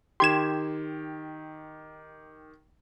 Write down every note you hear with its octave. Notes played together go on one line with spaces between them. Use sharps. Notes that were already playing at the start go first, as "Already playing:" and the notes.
D#3 G4 C6 G#6 E7